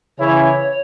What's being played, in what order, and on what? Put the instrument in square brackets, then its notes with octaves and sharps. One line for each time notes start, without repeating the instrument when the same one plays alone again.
[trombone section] C#3 E3 C#4 E4 [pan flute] C#5